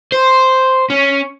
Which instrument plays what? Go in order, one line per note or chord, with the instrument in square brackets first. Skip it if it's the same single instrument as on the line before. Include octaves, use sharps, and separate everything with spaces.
[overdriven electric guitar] C5
C#4